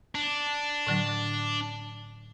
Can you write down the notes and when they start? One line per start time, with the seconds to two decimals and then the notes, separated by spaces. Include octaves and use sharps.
0.15 D4
0.87 A2 D3 F#3